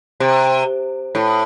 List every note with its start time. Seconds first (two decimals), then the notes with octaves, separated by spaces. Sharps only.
0.20 C3
1.15 A2